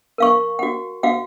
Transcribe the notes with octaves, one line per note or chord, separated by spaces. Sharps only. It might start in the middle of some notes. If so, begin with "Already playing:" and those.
A#4 F5 C#6
F#4 F#5
F#4 F5 F#5